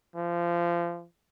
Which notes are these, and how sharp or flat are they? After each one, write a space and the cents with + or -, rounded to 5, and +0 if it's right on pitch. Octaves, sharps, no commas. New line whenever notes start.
F3 -25